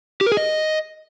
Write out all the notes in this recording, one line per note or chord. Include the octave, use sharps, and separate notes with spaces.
G4
A#4
G#4
D#5